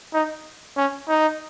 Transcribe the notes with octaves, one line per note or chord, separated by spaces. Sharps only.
D#4
C#4
D#4